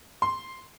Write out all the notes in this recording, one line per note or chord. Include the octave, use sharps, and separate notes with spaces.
C6